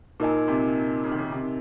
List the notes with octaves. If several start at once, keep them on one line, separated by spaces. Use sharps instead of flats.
A#2 D#4 A#4 D#5 G#5
C3
C#3
D#3
C#3
C3